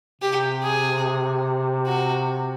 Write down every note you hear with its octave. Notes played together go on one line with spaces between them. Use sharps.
C3 G4
G#4
F#4